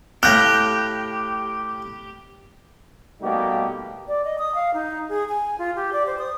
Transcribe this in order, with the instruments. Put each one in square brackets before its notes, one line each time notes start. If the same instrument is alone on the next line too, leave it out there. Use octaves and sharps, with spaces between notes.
[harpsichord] A2 F5 [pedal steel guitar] G4 [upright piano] F#6 G6 A#6
[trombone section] B2 G3 A3 A#3 D#4 G4
[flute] D5
D#5
D#6
F5
D#4
G#4
G#5
F4
G4
D5
C5
D#6